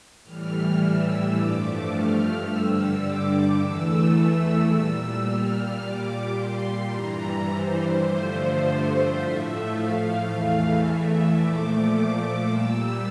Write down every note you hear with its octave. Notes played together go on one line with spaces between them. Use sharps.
A2 E3 G3 F6
E6
G2 F3 A3 D6
F6
G2 D3 G3 E6
D6
E2 E3 A3 E6
E6
A#2 G3 E6
F6
A#2 G3 D6
C6
G2 E3 G3 A#5
C5
G2 D3 F3 A3 C5
A2 F3 A3 E5
F5
E2 E3 A3 F5
E5
A#2 F3 A3 D6
A#2 G3 E6